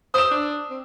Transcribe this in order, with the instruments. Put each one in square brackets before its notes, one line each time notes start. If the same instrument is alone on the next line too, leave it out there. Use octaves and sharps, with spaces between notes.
[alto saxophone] C5 [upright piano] D#6 E6 E7
[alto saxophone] D4
C4